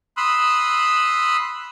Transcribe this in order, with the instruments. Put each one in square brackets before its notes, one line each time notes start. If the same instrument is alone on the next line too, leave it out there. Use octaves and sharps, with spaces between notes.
[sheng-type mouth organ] B5 C6 D#6 E6 F#6